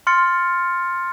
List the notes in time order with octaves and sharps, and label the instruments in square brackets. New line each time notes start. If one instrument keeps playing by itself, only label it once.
[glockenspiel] C6 F6 A6 C#7